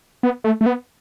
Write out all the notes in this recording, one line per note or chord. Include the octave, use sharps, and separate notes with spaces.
B3
A3
A3
B3